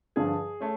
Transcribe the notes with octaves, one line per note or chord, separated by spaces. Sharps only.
G2 D3 F3 G#4
A3 C#4